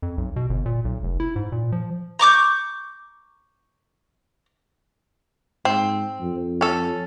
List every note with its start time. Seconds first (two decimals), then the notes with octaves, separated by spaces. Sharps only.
0.02 F2
0.18 B1
0.36 B2
0.49 G1
0.66 A#2
0.85 B1
1.03 F1
1.20 E4
1.36 G#2
1.52 A#2
1.72 F3
2.19 A#5 C#6 D6 G6
5.65 G#2 C4
6.21 F2
6.61 C#4 A4